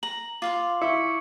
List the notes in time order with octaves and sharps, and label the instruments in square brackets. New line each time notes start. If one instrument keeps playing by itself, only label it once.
[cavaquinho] A#5 [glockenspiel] F#7
[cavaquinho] F4 F5 C6 [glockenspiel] D6
[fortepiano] E4 [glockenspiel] C#6 C#7